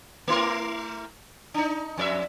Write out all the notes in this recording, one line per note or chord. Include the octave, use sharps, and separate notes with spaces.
A3 E4 A#4
D4 D#4
F2 D5 E5